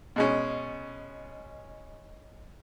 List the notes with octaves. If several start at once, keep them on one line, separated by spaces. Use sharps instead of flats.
B2 G#3 C#4